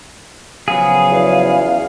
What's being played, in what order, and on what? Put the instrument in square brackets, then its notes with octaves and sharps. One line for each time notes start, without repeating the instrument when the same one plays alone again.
[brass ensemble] C#3 F3 F#3 [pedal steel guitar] B3 G#4 [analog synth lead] F5
[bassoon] E2